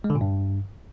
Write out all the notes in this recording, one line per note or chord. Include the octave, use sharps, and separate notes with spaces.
G#3
D3
A#2
G2